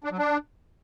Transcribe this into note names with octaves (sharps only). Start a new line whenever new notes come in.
D4
F#3
D4